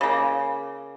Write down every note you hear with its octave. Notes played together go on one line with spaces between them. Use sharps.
C#3 A#3